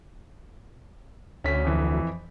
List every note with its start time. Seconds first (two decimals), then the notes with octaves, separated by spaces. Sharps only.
1.44 D2 C#4 B6
1.65 F2 E3